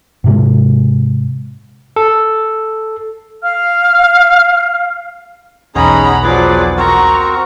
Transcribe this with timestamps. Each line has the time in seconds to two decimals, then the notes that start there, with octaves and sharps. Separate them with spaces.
0.24 G#2 C3 G#3
1.96 A4
3.43 F5 F6
5.75 B1 E2 C#4 D#4 G#4 F#5 A#5 B5
6.23 F3 F#3 G#4 B4 D5
6.77 C4 F#4 A#4 A#5 C#6